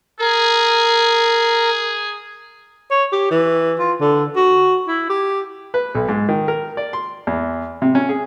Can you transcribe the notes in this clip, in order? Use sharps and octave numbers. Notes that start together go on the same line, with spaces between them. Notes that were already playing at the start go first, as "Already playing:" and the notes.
G#4 A#4
C#5
G4
E3
F4
D3
F#4
E4
G4
B4
B1
G#2
D#3
A#4
D5
C6
E2
C3
C#4
G#4